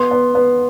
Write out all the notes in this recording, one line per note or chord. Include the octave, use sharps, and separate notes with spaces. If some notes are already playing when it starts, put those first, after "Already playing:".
Already playing: B3 C6
B3
B3